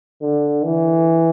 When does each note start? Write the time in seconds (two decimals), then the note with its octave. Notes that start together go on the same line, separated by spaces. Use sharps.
0.22 D3
0.64 E3